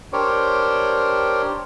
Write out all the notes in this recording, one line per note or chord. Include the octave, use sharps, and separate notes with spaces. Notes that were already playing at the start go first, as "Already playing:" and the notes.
D4 G4 A#4 C5 C#5